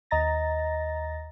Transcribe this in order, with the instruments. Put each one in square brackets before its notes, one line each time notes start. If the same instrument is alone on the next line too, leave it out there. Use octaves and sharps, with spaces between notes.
[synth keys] D#2 D#5 A#5 A6 A#6